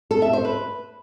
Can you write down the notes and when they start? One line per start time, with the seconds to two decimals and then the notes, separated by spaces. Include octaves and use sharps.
0.11 A4
0.22 E5
0.33 C5
0.45 B4